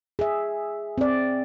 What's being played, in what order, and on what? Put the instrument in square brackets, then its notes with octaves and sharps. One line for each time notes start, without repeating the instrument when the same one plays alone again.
[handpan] G#4 E5
C4 D5